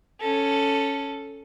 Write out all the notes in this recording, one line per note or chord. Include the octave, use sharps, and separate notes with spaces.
C#4 A4